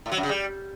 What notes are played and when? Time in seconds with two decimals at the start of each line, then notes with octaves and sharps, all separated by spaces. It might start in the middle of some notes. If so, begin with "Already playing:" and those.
0.06 A2
0.12 F#3
0.17 F#2
0.23 C#3
0.29 G3